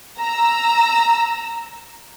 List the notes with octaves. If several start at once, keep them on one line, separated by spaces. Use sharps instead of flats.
A#5 E6